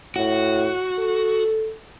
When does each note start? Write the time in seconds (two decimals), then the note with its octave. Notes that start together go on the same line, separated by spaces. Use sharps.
0.16 A2 F#4
0.99 A4